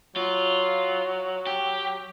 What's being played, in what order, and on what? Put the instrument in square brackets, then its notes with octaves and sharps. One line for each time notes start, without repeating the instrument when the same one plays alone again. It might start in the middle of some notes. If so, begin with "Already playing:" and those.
[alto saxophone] F#3 [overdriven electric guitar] F4
[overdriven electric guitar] G4